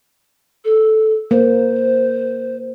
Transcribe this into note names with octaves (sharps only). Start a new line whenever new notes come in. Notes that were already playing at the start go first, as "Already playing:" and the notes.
A4
A#3 C5